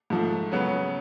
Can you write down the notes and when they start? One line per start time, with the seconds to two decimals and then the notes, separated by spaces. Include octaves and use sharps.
0.10 G#2 F3 A3
0.52 C#3 F#3 B3